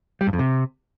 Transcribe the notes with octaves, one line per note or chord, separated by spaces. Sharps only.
G3
G2
F2
C3